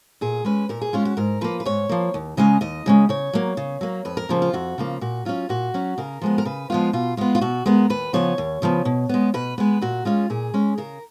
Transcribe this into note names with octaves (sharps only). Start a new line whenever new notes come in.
A#2 G#4
G#3 C#4 B4
A#2 A#4
G#4
G#3 C#4 F4
F#4
G#2 A#4
F3 A#3 B4
B4
G#2 C#5
F3 A#3
D#2
C#3 G#3 C#4 D#5
D#2 D#5
C#3 G#3 C#4
C#3 C#5
F#3 A#3
C#3
F#3 A#3
F2 B4
A#4
C#3 F3 A#3
F4
F2 F#4
C#3 F3 A#3
A#2 F#4
F#3 C#4 F4
A#2 F#4
F#3 C#4
C#3 A#4
F3 G#3 B3
A#4
C#3 B4
F3 G#3 B3 F4
B2 F4
G#3 B3 F4
F4
B2 F#4
G#3 B3 A#4
D#2 B4
C#3 F3 B3 C#5
D#2
C#3 F3 B3
B2
G#3 B3
B2 B4
G#3 B3 B4
A#2 F#4
G#3 C#4 F4
A#2 G#4
G#3 C#4
C#3 A#4